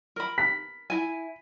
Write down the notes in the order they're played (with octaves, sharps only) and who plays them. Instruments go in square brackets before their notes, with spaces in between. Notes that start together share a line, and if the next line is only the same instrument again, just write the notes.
[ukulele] A#4 B5
[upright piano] B6
[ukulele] E4 G#5